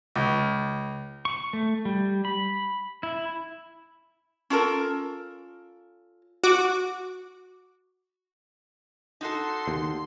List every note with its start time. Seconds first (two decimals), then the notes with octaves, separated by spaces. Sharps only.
0.16 C#2
1.25 C#6
1.53 A3
1.85 G3
2.25 B5
3.03 E4
4.50 C#4 F4 A4 A#4
6.44 F#4 D6
9.21 D#4 F#4 A4 C6
9.68 D#2